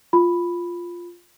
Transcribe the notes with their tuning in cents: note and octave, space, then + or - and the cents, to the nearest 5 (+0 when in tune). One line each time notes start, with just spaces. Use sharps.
F4 +0 B5 +0